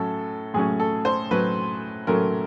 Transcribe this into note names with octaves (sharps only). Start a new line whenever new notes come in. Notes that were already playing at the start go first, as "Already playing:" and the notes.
Already playing: A2 F#3 A3 C#4 A4
A2 F#3 A3 C#4 G#4
A4
C5
A2 F#3 A3 C#4 B4
A2 F#3 A3 C#4 A#4